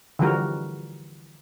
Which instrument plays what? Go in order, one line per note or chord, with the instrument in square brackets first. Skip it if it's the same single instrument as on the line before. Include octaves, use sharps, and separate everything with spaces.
[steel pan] D3 E3 F3 G3 F#4 A#4